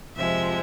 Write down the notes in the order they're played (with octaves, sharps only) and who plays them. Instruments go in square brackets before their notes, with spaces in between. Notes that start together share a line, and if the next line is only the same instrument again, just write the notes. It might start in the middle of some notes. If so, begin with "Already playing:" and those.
[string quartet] F2 C3 F3 G#3 E5